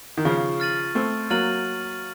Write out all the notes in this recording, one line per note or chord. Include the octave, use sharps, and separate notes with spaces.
D#3
C#3 F3 C#6
F6 A6 D#7 F#7
A3 C4 C#6
F#3 A#3 F6 A6 D#7 F#7